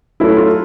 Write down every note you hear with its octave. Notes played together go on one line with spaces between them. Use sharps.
F#3 A3 C#4 E4 F#4 A4
F4